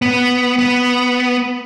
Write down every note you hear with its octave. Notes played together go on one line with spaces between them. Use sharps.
B3
B3